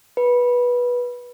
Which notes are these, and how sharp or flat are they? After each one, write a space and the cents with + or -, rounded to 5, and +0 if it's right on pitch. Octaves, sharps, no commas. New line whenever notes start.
B4 -15